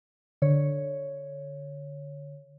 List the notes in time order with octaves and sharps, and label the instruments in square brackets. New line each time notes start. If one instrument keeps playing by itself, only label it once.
[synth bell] D3 C#5